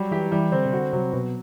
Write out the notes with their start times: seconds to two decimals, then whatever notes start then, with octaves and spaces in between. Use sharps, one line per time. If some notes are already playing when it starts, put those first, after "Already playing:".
Already playing: F#3 G3
0.11 E3 G4
0.32 E3 G3
0.52 D3 C4
0.66 C3
0.72 D3 F#4
0.93 C3 F#3
1.13 B2 F#3